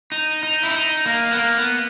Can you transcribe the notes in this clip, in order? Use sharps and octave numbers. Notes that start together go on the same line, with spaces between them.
D#4
D#4
E4
D#4
A#3
B3
A#3
B3